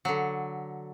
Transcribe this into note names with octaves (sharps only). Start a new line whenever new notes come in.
D3 F#3